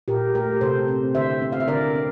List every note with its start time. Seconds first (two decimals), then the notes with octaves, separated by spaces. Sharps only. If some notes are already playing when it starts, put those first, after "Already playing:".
0.08 A#2 G4 A#4
0.35 A3 G4 A#4
0.61 C3 A4 C5
0.88 C4
1.15 D3 C5 E5
1.42 C4
1.52 F5
1.60 E5
1.68 D3 A#4 D5
1.95 C4